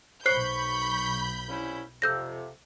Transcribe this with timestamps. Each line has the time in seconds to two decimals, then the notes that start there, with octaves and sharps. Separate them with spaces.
0.26 B1 C5 B5 C#6 F#6 G6 C7
1.47 C2 C#4 E4
2.02 F2 C3 E6 G6 A#6